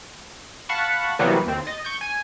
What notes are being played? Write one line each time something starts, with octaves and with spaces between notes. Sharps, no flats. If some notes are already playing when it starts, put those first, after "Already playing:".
F5 F#5 A5 B5 C#6
C3 E3 F#3 G3 A#3 B3
D#2 C4
D#5 A6
C#6 G6
G#5